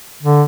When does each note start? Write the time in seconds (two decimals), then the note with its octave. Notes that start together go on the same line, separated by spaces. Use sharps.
0.23 D3